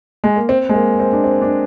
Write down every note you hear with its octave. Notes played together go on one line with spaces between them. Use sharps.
G#3
A#3
C4
G#3
A#3
C4
D4
C4
D4